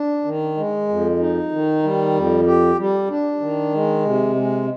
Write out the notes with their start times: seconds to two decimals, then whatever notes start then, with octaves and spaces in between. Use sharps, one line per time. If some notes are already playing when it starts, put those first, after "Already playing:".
Already playing: D4
0.25 D#3
0.57 G#3
0.88 F2
1.19 D#4
1.52 D#3
1.83 G3
2.14 F2
2.46 G4
2.78 G3
3.10 D4
3.41 D#3
3.74 G#3
4.04 C3
4.36 G#3